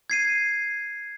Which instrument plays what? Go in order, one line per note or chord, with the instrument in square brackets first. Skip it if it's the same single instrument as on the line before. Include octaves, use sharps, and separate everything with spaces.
[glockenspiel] G#6 C7 D#7